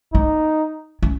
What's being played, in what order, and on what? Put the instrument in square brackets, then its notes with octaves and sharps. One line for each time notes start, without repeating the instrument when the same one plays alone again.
[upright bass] A#3 [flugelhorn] D#4
[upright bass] C#4